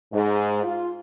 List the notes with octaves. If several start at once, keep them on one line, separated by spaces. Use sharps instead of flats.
G#2
F4